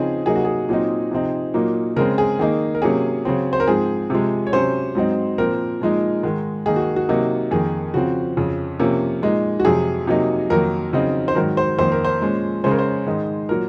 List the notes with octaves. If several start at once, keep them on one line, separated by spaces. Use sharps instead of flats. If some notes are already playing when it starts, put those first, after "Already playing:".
Already playing: C#3 F3 C4 D#4 G#4
C3 F#3 A#3 D#4 G#4
F#4
G#4
A#2 F#3 C4 D#4
C3 F3 C4 D#4
A#2 F#3 A#3 D#4
C#3 G#3 C4 A#4
G#4
D#3 A#3 D#4 G#4
A#4
C3 F#3 A#3 C#4 G#4
C#3 F#3 C4
C5
A#4
G#2 F3 C4 G#4
C3 F3 G#3
C#5
C3 F#3 C#4 C5
G#2 F#3 C4 D#4
A#2 F3 C4 A#4
A#2 F3 G#3 D#4
G#2 D#3 G#3
D#3 A#3 D#4 G#4
F#4
F#4
C3 F#3 A#3 D#4
F2 D#3 A#3 G#4
C#3 F3 C4 F#4
F2 C#3 F3
C3 F3 A#3 C#4
A#2 G#3 D#4
F#4
F2 C3 F#3 G#4
C3 F#3 A#3 D#4
F2 D#3 F#3 A#3 A#4
C#3 F#3 C4 D#4
C5
G#2 D#3 F#3 A#4
C5
F2 D#3 A#3 C5
A#4
C5
A#2 G#3 C#4
C#3 G#3 C#4 C5
A#4
C5
G#2 D#3 G#3 D#4
A#2 F#3 A#4